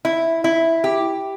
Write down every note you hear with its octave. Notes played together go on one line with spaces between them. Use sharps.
E4
E4
G4